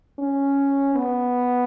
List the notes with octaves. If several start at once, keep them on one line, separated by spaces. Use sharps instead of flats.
C#4
B3